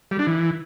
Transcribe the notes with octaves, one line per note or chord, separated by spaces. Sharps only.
G3
D4
E3